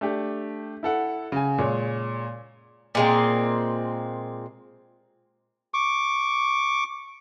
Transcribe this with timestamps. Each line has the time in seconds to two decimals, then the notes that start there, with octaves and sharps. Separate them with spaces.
0.01 A3 D4 G4
0.83 E4 A4 F#5
1.32 C#3 G#5
1.58 A#2 G#3 C#5
2.95 A#2 G#3 C4
5.74 C#6 D6